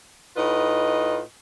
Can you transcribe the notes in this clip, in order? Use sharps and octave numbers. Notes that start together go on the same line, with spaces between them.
A2 D#4 F4 B4 D#5